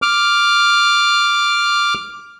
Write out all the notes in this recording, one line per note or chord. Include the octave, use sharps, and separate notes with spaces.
D6 F6